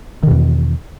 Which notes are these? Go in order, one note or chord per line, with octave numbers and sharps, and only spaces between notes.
E2 B2 D#3